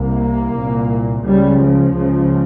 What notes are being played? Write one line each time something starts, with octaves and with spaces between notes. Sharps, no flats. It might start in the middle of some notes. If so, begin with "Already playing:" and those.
Already playing: C2 C3 A#3
C2 A#2
C#2 C#3 G3
F3
C#2 C#3